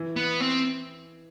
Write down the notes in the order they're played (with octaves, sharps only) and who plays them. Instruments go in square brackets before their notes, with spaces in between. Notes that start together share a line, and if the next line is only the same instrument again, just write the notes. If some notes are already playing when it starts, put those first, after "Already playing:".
Already playing: [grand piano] E3
[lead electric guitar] B3
C4